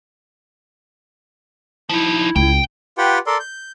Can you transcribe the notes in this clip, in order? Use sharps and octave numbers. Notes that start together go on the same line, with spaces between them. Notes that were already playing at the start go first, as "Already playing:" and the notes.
F3 D#4 E4
C#2 G5
F4 G4 B4 F#5 G5
A4 A#4 D5 C6
G6